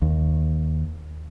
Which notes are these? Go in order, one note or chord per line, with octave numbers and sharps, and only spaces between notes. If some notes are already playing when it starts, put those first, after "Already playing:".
D#2